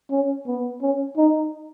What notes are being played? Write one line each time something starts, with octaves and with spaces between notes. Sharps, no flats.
C#4
B3
C#4
D#4